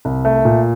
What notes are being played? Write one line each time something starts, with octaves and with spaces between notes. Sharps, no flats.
C2
A3
A#2